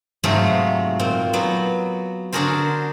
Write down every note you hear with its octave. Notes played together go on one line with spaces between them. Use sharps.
G#2 C3 F#3 G#3 A3 F4
A#2 C4
F#3 B3
D3 D4 F#4 G#4 A#4 C5